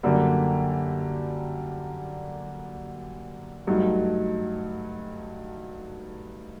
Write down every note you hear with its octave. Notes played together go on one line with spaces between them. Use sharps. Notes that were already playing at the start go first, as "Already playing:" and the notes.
F#2 D3 G3 A#3
G2 F#3 A3 D#4